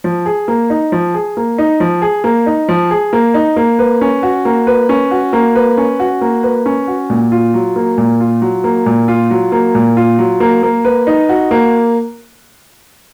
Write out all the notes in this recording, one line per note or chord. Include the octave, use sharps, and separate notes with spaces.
F3
G#4
A#3
D#4
F3
G#4
A#3
D#4
F3
G#4
A#3
D#4
F3
G#4
A#3
D#4
A#3
B4
C#4
F#4
A#3
B4
C#4
F#4
A#3
B4
C#4
F#4
A#3
B4
C#4
F#4
A#2
F4
F#3
A#3
A#2
F4
F#3
A#3
A#2
F4
F#3
A#3
A#2
F4
F#3
A#3
A#3
B4
D#4
F#4
A#3